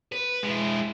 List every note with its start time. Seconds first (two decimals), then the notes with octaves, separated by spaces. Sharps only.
0.12 B4
0.43 G#3 E4